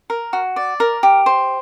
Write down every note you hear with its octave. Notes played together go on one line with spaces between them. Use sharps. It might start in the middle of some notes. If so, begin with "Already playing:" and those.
A#4
F#4
D5
A#4
G4
C5